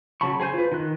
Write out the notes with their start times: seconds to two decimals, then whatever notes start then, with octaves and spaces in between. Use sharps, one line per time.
0.21 C#3 F#3 A5 B5 C#6
0.40 G#4 C5 G#5 G6
0.54 F4 B4
0.72 D#3 F#6